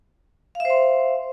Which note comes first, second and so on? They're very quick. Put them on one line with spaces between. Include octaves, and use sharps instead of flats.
F5 E5 C5 C6